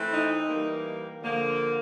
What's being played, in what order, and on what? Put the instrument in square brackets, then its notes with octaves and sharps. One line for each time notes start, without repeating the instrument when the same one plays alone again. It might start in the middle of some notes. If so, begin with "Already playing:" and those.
Already playing: [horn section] E3 A3 C4
D#4
E3 G3 A#3
D3 F3 A#3